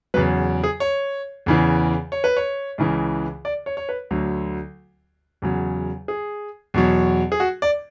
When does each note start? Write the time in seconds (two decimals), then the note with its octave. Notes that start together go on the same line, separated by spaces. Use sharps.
0.14 E2 C#3 F#3 B4
0.64 G#4
0.80 C#5
1.46 E2 C#3 E3
2.12 C#5
2.24 B4
2.37 C#5
2.78 C#2 C#3 E3
3.45 D5
3.66 C#5
3.77 C#5
3.89 B4
4.11 D2 D3 F#3
5.42 E2 C#3 F#3
6.08 G#4
6.74 E2 B2 F#3
7.32 G#4
7.40 F#4
7.62 D5